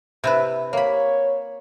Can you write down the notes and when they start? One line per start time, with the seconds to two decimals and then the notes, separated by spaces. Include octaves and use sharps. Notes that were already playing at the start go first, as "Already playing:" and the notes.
0.24 C3 E4 B4
0.73 A#3 C#5 B5